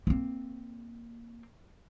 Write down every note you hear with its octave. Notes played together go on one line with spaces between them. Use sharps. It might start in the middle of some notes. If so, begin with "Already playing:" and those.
A#3 C4